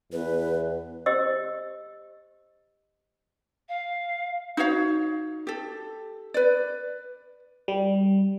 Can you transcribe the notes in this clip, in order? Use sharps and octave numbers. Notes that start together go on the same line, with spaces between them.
E2 B4
G4 C5 D#5 E6
F5
D#4 F#4 C#5 F5
G4 A4
B4 D5
G3